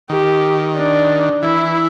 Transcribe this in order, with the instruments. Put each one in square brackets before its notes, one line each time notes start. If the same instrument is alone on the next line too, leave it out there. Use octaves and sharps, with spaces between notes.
[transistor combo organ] D#3 [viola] G4
[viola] D4
[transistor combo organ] E3 [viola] E4